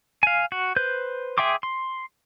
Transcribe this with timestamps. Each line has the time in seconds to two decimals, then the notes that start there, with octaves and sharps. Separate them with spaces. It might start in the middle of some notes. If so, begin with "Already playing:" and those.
0.23 F5 G#5
0.52 F#4
0.76 B4 C5 G6
1.38 G#4 E5 G5 C6 D6
1.63 C6